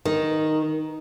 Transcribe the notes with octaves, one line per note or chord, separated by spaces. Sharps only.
D#3